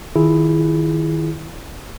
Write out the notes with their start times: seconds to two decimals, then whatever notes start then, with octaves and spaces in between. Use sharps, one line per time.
0.16 D#3 E4 F4 G#4